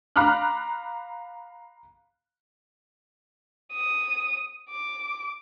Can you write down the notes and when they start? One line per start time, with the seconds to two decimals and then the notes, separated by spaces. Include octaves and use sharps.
0.16 F5 A#5 B5 D6 F6 F#6
3.74 D#6
4.70 D6